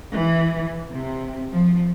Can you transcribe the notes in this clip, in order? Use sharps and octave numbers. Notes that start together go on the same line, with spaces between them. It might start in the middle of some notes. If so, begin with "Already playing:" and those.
E3
C3
F3